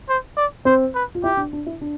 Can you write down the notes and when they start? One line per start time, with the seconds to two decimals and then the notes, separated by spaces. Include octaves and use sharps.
0.09 C5
0.37 D5
0.65 C4 C5
0.95 B4
1.15 F4
1.24 E4 G4
1.37 D4
1.53 D4
1.66 E4
1.81 D4